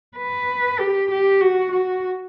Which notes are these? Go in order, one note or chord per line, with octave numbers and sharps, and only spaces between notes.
B4
G4
G4
F#4
F#4